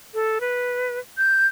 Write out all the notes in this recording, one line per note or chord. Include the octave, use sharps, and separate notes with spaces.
A4
B4
G6